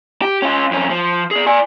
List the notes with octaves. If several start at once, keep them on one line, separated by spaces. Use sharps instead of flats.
G4
C#4 F4
F2 C#4
F3
G#4 D5
D5 G#5